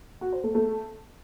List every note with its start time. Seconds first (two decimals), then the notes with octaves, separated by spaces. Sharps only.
0.21 F#4
0.32 C5
0.44 A3
0.55 A3